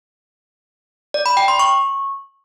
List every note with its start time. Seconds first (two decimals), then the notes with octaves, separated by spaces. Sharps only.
1.14 D5
1.26 B5
1.37 G5
1.48 C6
1.59 C#6